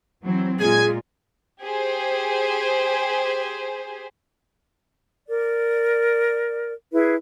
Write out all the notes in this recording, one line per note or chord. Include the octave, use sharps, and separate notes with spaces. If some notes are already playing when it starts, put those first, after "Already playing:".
E3 F#3 C4
A#2 G#3 F4 G#4 G#5
G4 G#4 C5
A#4 D5
E4 G#4 B4